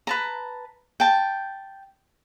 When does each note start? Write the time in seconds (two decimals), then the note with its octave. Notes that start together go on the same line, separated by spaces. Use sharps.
0.07 B4 A5 A#5
1.00 G5 A5